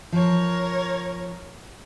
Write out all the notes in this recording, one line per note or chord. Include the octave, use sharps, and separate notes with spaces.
F3 A#4 C#5